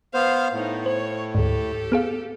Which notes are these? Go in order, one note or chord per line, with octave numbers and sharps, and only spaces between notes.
B3 C5 F5
A2 B3 D#4
C5 C#5
D2 G#2 G4 A4
B3 G#4 F5